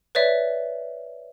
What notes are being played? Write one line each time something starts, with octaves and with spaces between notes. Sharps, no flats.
B4 C#5 D5 E5